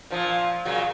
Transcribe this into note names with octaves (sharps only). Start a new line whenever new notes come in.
A#2 F3
A#2 C#3 F#3